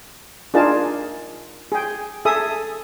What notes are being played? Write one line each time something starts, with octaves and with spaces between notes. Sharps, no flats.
D4 D#4 F4 G#4 A#4 A5
G#4 G5
G#4 A4 E5 D#6